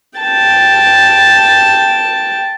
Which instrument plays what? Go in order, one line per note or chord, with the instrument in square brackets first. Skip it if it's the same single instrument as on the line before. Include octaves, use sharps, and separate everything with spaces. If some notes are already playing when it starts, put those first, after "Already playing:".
[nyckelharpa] G5 A5